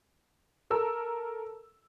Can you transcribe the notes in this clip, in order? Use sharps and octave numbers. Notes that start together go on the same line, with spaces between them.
A4 A#4 E6